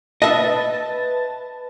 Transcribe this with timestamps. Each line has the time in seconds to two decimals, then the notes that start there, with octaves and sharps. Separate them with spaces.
0.22 B4 D#5 E5 A5 A6